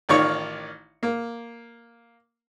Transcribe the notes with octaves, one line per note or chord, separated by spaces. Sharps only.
A1 D#3 F4 C#5 D5 C#6
A#3